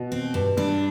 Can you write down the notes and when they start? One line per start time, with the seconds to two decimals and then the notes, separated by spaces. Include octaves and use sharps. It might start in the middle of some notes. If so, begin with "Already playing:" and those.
Already playing: B2
0.12 C4
0.34 G2
0.57 G2 D4